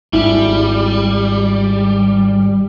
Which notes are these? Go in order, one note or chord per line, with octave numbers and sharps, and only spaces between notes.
G#1 G3 E4